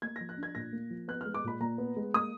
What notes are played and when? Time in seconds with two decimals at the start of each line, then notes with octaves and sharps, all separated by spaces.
0.02 A#3 G#6
0.16 A#6
0.21 F3
0.29 F#6
0.37 D4
0.43 G#6
0.55 A#2 A#6
0.73 A#3
0.90 F3
1.08 B3 F#6
1.21 F6
1.25 G#3
1.34 D6
1.44 A#2 B5
1.60 A#2 A#5
1.78 B3
1.96 G#3
2.14 A#3 D#6